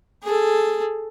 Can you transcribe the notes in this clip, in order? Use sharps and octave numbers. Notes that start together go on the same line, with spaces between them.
G#4 A4